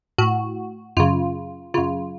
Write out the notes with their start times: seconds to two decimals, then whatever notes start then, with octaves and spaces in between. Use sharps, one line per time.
0.18 A2 F#4
0.97 F#2 C#3 F4
1.74 F#2 C#3 F4